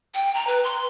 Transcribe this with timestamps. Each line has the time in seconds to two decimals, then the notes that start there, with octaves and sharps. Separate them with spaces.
0.14 G5
0.34 A#5
0.47 B4
0.64 C6